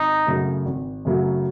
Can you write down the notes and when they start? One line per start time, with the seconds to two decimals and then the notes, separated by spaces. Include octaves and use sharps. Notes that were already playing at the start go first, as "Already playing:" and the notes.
Already playing: G#1 D#4
0.27 F#2 C#3 F#3 A3
0.66 G#1
1.05 F#2 C#3 F#3 A3